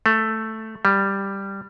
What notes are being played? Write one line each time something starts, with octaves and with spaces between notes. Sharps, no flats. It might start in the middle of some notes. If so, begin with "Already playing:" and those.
A3
G3